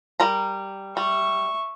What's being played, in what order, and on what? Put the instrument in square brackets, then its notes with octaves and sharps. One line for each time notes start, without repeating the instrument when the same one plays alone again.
[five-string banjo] G3 A#4 A#5
[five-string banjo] G3 [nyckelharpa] E5 C#6